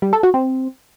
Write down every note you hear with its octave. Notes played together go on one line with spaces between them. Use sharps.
G3
A4
F#4
C4